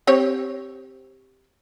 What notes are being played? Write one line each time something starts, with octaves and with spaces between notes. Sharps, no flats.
C4 G4 C#5